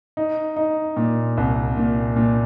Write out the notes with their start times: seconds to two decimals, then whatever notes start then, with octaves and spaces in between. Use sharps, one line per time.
0.17 D#4
0.57 D#4
0.96 A#2
1.37 C2
1.77 A#2
2.16 A#2